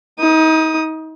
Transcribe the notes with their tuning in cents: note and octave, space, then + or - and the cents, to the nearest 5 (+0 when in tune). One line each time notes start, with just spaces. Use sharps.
D#4 +35 D#6 +0